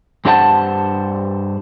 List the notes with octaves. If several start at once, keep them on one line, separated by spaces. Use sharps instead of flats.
G2 D4 G4 C5 F#5 A5